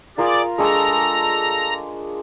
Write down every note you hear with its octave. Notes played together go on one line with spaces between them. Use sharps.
F4 G#4 A#4 D5 F5
G#3 D4 A4 A#5 C#6